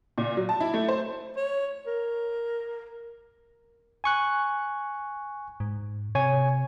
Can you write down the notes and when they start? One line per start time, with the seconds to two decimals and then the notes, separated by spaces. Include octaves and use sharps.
0.18 A#2
0.37 F#3
0.49 A5
0.60 E4
0.74 A3
0.88 C5
1.36 C#5
1.87 A#4
4.04 G#5 C#6 F#6
5.60 G#2
6.15 C3 C#5 G#5 G#6